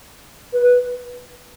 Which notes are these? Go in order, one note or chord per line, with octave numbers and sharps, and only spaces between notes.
B4